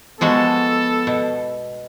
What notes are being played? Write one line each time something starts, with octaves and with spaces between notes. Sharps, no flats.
F3 G#3 B3 F#4 A4
B2